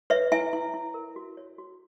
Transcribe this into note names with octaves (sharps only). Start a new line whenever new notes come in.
B4 C#5 E5
E4 E5 G#5
E4
E4
A#4
F#4
C#5
F#4